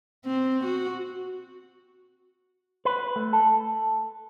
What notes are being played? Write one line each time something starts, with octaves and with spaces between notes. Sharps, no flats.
C4
F#4
B4
A3
A4